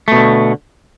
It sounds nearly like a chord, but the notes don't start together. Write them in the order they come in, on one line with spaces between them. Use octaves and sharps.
A3 B2 D3